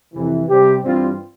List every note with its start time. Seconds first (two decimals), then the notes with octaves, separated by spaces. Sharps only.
0.14 F2 C3 E3
0.49 C3 G3 C4 G4
0.83 G2 E3 G3 C4 F4